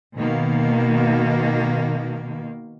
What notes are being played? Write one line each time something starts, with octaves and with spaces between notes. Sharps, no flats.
B2 D#3 A#3